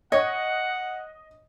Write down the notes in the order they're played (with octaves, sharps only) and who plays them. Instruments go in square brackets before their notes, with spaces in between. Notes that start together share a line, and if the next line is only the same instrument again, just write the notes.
[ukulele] C#5 [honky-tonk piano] D#5 [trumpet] F#5